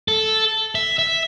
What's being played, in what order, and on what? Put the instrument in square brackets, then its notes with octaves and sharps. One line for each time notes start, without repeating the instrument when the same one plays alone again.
[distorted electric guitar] A4
E5
E5